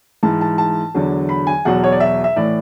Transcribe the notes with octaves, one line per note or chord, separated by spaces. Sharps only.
G#2 E3 A5
A5
A5
E2 D3 F#3
B5
G#5
E2 B2 F#3 F#5
C#5
D5
E5
E5
A2 E3 D5